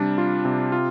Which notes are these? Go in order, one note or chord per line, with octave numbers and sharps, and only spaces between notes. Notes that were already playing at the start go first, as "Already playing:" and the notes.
Already playing: C3 G3 D4
F4
C3
F4